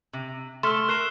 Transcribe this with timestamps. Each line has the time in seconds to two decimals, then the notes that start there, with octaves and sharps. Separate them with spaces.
0.13 C3
0.63 A3 C6 E6 F6 E7
0.88 A#4 F#6 C7 E7